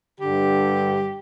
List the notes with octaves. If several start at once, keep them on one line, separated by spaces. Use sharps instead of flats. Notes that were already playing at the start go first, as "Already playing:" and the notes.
G2 D3 G4